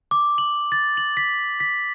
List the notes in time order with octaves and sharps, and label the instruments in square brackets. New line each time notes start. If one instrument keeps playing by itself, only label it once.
[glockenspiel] D6
F#7
A6
F#7
B6
B6